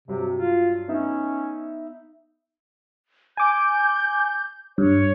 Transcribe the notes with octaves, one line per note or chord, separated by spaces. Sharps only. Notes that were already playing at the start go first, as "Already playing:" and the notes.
G2 C3 F#3
F4
B3 C#4 D#4 E5
G#5 D6 G6
G2 C#5